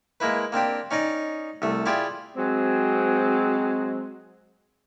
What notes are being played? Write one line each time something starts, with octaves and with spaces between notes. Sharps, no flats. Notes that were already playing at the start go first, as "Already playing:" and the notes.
G#3 A#3 E4 B4
A#3 C4 D4 G4
C#4 D#4 D5 D#5
C2 A3
E4 F4 G4 G#4 D5
F#3 G#3 C4